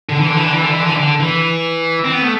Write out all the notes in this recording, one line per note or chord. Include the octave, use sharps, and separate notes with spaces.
D3
E3
D3
E3
D3
E3
D3
E3
D3
E3
D3
E3
C4
B3
A3